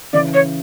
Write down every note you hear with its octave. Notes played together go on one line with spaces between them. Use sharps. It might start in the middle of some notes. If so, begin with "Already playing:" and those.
C#3 E3 D5
C#5